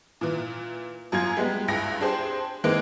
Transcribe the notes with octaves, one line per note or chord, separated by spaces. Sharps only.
A#2 E3
F#2 F#3 F4 G#6
G3 G#3 B3
C#2 G2 E4 A#6
D4 G4 G#4 C5 C6
D3 E3 G#3 A#3 C4 D#4